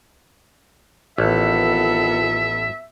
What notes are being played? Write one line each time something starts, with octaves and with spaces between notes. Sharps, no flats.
A1 F2 D#3 B3 F4 A4 E5